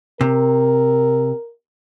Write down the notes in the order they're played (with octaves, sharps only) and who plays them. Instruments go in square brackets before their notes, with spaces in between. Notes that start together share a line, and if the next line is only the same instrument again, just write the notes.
[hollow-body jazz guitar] C3 [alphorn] A#4